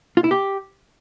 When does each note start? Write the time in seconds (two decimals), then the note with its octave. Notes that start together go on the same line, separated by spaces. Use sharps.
0.17 F4
0.24 E4
0.31 G4